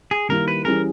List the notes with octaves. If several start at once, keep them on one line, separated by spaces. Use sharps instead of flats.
G#4
D#3 G3 A#3 E4 A#4
B4
E3 G3 C#4 G#4 A#4